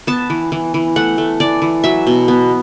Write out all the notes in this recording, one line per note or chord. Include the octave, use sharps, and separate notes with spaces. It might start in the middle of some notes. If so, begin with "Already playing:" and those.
B3 A5
E3
E3
E3
A3 F#5
A3
E3 D5
E3
F#3 E5
B2
B3